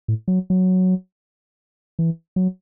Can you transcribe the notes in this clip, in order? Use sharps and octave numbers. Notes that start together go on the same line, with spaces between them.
A2
F#3
F#3
E3
F#3